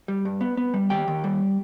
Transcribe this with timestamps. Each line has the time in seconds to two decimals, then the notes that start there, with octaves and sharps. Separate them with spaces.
0.08 G3
0.25 G2
0.41 B3
0.57 B3
0.74 G3
0.90 D#3 G4 G5
1.08 D#3
1.24 G3